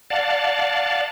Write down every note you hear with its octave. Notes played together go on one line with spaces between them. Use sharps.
D5 F5 F#5 A5